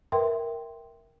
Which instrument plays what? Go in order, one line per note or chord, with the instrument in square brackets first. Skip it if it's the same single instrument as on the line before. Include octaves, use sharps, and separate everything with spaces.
[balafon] A#4 B4 E5 G5 C6